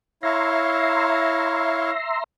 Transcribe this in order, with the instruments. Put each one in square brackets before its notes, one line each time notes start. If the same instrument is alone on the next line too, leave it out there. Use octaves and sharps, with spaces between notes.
[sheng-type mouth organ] E4 C#5 F5 [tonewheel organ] E5 A#5 C6